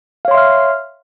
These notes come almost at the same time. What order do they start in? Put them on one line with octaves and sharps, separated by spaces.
F5 C#5 C6 E5 F6